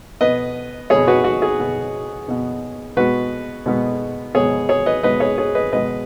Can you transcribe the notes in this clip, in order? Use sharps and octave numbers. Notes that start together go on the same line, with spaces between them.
B2 B3 B4 D#5
B2 B3 G#4 C#5
F#4 B4
F#4
G#4
B2 B3
B2 B3
B2 G#3 B3 F#4 B4
B2 G#3 B3
B2 G#3 B3 G#4 C#5
G#4 C#5
B4 D#5
B2 G#3 B3 B4 D#5
G#4 C#5
G#4 C#5
B4 D#5
B2 G#3 B3 B4 D#5